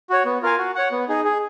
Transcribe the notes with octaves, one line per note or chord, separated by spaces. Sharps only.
F#4 C#5
B3
F4 A#4 F5 G#5
F#4
C#5 F#5
B3
D#4 G#4
G#4